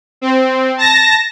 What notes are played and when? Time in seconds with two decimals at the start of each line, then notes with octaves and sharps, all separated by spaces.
0.21 C4
0.78 A5 A#6